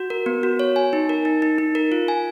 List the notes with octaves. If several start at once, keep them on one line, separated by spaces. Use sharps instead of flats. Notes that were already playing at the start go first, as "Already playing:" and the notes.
Already playing: F#4
A#4
B3
F#4
C#5
G#5
D#4
A#4
D#4
D#4
D#4
A#4
F4
G#5